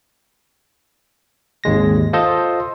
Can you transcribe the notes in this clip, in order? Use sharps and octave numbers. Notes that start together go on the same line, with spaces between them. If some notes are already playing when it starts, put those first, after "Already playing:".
G#1 D#2 G#3 A#6
F4 A4 C5 D#5